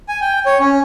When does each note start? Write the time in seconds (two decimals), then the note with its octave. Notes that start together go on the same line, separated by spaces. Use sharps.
0.09 G#5
0.21 G5
0.46 C#5
0.60 C#4